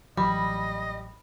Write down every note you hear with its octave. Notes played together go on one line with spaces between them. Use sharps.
A1 E3 F#3 G3 D#5 B5